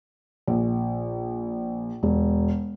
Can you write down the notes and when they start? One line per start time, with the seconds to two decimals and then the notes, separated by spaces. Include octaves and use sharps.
0.47 A#1
2.03 E1